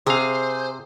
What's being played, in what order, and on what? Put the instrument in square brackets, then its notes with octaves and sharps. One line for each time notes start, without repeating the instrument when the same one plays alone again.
[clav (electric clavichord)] C3 F5 [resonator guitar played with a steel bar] G#4 [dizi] C5